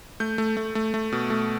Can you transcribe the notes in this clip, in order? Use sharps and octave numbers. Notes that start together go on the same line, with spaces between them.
A3 G6
A3
A3
A3
A3
B2
A3